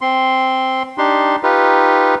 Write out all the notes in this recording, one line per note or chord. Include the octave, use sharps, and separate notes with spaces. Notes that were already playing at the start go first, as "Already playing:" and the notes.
C4 C6
D4 D#4 G4 C6
D#4 F4 G4 B4